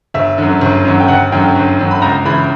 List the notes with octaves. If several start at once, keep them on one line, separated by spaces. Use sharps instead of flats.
G1 E5
F#2 D3
G1
F#2 D3
G5
G1 F#5
F#2 D3 G5
G1
F#2 D3
B5
C#2 A#5
C#3 E3 B5